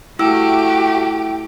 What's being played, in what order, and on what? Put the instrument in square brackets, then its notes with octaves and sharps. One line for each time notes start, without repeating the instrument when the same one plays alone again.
[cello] A3 F#4 [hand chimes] E4 E6 [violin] G4